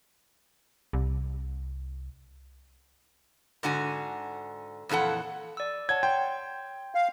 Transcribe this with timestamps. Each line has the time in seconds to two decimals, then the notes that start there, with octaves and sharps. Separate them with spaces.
0.93 C2
3.63 G#2 D3 F#4 G#5
4.89 F2 A#2 E3 A4 F#5
5.57 D5 E6
5.89 C#5 F#5 A5 G#6
6.03 G5 C6
6.95 F5